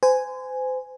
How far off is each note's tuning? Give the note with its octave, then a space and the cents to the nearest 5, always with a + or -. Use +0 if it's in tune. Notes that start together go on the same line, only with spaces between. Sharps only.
C5 -35 G#5 +0